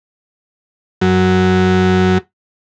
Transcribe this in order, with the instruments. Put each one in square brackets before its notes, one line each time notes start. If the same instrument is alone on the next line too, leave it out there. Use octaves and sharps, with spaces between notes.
[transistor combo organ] F#2 F#3